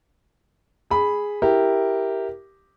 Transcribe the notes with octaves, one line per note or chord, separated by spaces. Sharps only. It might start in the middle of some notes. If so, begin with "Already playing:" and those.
G#4 B5
E4 G4 A#4